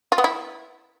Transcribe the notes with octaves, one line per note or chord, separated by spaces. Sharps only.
F4
B3
E4